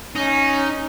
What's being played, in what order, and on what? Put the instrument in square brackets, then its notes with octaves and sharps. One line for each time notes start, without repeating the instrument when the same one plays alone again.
[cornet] C#4 [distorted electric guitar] D#4